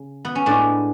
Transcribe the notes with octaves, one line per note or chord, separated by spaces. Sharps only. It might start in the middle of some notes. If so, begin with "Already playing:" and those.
Already playing: C#3
B3
C#4
A2 G#3 D4